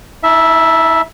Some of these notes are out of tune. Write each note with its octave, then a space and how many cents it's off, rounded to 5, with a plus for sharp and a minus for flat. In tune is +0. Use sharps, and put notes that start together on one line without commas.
E4 -45 E5 +0 A5 +0